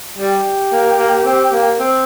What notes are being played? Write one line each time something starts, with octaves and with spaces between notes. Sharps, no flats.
G3 G4
A#3
A#3
C4
A#3
C4